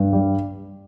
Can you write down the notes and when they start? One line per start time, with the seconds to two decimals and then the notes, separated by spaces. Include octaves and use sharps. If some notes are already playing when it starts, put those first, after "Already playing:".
Already playing: G2
0.13 G3